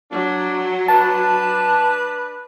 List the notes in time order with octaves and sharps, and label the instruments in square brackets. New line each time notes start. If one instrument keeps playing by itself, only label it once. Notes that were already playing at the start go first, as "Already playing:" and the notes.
[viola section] F#3 [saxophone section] D4
[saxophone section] D4 B4 [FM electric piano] A5